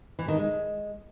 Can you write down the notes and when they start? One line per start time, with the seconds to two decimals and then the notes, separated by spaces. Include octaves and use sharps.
0.19 E3
0.28 D#3
0.38 G#3